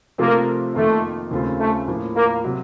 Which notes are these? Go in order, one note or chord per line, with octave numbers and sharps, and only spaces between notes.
C3 F3 A3 A#3 C4 F4
F2 D#3 A3 A#3 F4 A#4
D#2 C#3 A3 C4 F4
A3
A2 F3 A#3
A#3
C3 F#3